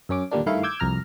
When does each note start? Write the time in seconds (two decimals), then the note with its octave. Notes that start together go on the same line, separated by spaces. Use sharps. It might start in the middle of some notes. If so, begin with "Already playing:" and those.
0.09 F#2 C#4 D6
0.31 D#2 A#2 D3 G3 A#3 D4
0.46 G2 D#3 A3 E4 F5
0.63 D6 E6 G6 G#6
0.80 C2 F2 A#5 F6